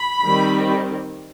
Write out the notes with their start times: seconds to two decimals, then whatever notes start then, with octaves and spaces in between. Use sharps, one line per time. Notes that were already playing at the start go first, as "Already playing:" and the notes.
Already playing: B5
0.23 D#3 G3 C4